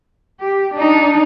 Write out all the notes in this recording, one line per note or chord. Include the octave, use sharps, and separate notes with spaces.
G4
D4 D#4